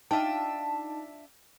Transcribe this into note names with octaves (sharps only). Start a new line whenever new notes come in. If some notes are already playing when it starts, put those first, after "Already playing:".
D4 D#4 F4 E5 G5 A5